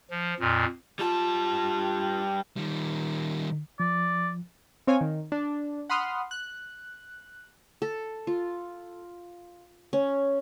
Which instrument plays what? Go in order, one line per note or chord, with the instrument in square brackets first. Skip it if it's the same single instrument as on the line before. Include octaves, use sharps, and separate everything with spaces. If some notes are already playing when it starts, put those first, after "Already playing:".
[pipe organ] F3
F2 A#2
[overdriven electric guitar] G3 A5 [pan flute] F4
[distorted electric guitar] D#3 G3
[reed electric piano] F3 [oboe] D5
[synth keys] C4 C#5 F5 G#5
D#3
D4
F#5 B5 C6 D#6 F6
F#6
[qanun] A4
F4
C#4